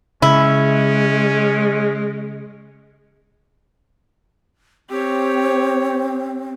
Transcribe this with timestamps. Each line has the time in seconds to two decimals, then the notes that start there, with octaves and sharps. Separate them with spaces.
0.22 C#3 G#3 C#4 E4
4.90 C4 G4 C#5